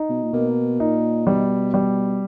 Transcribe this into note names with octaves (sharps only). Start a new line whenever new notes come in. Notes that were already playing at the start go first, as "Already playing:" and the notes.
Already playing: D#4
B2
A#2
B2 A#3
A#2 D#4
B2 G3
G3